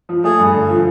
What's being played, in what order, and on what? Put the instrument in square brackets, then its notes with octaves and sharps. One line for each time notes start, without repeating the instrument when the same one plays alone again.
[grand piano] F3
[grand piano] A3 [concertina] G#4
[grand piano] G2
D3
F3